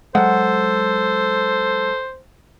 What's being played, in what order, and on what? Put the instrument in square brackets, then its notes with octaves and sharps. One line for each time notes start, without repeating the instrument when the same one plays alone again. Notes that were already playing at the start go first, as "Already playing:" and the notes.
[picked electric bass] F#3 G#3 [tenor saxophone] A4 [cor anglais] C5 [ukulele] F#5